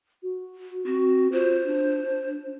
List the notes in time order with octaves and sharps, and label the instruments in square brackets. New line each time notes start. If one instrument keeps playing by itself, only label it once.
[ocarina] F#4
[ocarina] C4 [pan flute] F#4
[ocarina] F4 [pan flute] C5
[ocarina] D4